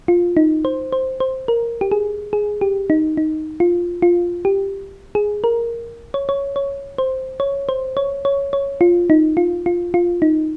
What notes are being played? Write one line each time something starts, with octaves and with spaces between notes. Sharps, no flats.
F4
D#4
C5
C5
C5
A#4
G4
G#4
G#4
G4
D#4
D#4
F4
F4
G4
G#4
A#4
C#5
C#5
C#5
C5
C#5
C5
C#5
C#5
C#5
F4
D#4
F4
F4
F4
D#4